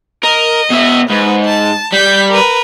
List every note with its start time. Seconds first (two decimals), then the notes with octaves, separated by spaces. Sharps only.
0.23 A#4 D#5
0.70 B2 E5
1.10 G#2 B4
1.45 A5
1.92 G3 G6 B6
2.29 A#4 B4